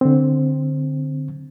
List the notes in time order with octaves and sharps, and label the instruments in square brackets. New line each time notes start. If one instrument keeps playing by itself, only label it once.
[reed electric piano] D3 C4